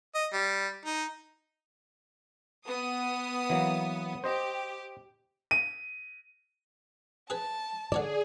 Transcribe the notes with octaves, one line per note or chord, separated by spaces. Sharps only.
D#5
G3
D#4
B3 D#6
E3 F#3 A#3
G4 C5 D#5
D#7
G#4 B4 A5
D3 G#4 C#5 D5 A5